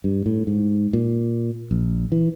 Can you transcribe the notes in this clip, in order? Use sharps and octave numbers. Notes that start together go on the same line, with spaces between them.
G2
A2
G#2
A#2
A#1
E3